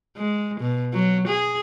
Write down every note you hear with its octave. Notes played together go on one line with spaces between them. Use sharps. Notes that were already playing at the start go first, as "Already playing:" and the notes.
G#3
B2
F#3
G#4